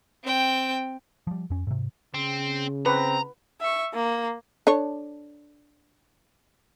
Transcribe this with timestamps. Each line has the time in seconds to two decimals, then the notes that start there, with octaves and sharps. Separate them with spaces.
0.24 C4 G5
1.27 F3 G3
1.50 F2 C#4
1.67 G#2 C3
2.14 C#3 C4
2.86 C4 B4 A#5
3.61 E5 C#6
3.94 A#3
4.67 D4 A4 C#5